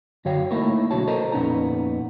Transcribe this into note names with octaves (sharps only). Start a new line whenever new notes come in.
F#2 D3 F#4 C#5 F5 G5
A3 A#3 D#4 E4 A#4 C#5
B1 D3 F#4 C#5 A5
A4 A#4 C5 D#5 A5 A#5
F2 A#2 B3 C#4 D#4 A#5